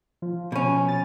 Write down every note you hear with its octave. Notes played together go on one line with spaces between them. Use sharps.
F3
B2 C#4
A6